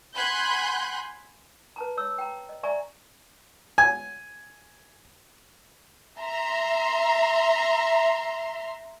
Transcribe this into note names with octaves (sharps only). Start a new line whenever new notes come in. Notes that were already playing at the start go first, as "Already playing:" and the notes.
F#5 G#5 B5 C6 F#6 G6
B4 A5 A#5
C#5 E6
G5 A#5
D#5
D5 E5 G#5 A#5 C#6
G#5
E5 A#5 C6